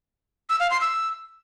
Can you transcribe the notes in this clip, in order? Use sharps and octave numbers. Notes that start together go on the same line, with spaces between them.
E6
F5
C6
E6